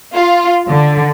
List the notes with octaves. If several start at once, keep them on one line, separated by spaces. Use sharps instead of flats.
F4
D3